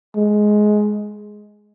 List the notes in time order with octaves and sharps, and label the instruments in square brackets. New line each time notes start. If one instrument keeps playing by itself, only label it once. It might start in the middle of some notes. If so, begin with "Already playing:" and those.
[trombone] G#3